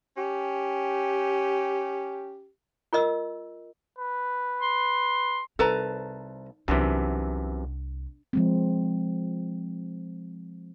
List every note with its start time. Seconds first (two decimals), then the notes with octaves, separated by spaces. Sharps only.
0.16 C#4 G4
2.93 F4 A#4 D#5 E6
3.98 B4
4.61 C6
5.59 C2 D#4 A4 B4 A5 A#5
6.68 C2 F#2 C3 E3 D4
8.33 F3 G#3 C4